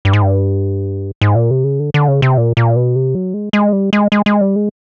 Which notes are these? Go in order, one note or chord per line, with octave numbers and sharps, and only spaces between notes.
G2
G#2
G2
G#2
A#2
C3
C#3
D3
D3
C#3
C3
A#2
A#2
B2
C3
F#3
G#3
G#3
G3
G#3
G#3
G#3
G3
G#3